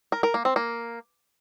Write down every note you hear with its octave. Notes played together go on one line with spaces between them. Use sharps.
A#4
A#4
A#3
C4
A#3